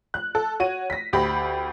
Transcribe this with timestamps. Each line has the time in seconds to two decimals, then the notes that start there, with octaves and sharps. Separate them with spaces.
0.14 F#6
0.35 A4
0.60 F#4 C#5 D#7
0.90 A#6 B6
1.13 D2 G4 B5